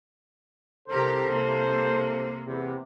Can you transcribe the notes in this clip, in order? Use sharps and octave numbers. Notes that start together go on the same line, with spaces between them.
C2 C3 G4 A4 A#4 C5
C3 A#3
E2 C3